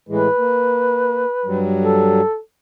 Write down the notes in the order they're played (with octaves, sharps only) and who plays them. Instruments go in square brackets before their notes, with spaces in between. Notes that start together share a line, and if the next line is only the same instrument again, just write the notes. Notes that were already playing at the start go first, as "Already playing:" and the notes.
[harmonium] A2 E3 G#3 [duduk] B4
[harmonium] A#3
G2 F#3 G3
[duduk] A4